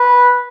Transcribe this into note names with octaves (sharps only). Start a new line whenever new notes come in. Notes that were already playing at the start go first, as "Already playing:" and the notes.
Already playing: B4